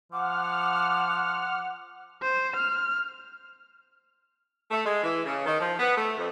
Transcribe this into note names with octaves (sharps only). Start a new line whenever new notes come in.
F3 F#5 D6 F6
C5
F6
A3
G#3
E3
C#3
D#3
F3
B3
A3
F2